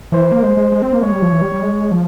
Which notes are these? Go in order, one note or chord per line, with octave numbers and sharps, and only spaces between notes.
E3 C5
A#3
G#3 C5
G#3
G#3
C4
A#3
G#3 C#5
G3
F3
E3
G3
G3
G#3
F3